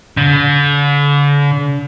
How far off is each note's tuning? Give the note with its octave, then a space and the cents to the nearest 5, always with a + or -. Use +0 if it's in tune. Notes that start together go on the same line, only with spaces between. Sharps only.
D3 -40